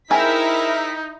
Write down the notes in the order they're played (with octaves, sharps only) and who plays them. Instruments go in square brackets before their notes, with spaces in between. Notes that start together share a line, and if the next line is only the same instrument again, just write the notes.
[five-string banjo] C4 G#4 G5 [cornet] D#4 [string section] E4 B6 [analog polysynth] A#4 E5